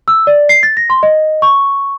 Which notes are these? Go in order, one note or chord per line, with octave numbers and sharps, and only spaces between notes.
E6
D5
C7
A6
A#6
C6
D#5
C#6